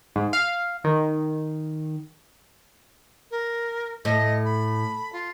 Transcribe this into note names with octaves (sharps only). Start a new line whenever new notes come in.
G#2
F5
D#3
A#4
A2 D#5
B5
F4